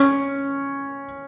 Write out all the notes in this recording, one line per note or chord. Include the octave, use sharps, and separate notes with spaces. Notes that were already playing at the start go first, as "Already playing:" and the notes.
Already playing: C#4